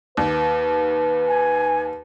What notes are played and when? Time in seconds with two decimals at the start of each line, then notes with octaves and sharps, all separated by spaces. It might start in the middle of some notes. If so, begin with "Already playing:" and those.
0.17 D#2 B4
1.28 G#5